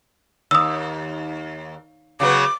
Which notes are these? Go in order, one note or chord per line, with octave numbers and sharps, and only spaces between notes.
D#2 D#6 E6
C#3 F#3 B3 D6